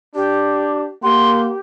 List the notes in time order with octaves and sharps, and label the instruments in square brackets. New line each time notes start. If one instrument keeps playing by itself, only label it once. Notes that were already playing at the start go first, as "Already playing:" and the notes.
[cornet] D4 [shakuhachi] G4
[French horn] A#3 [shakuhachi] G4 [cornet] F#5 [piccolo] C6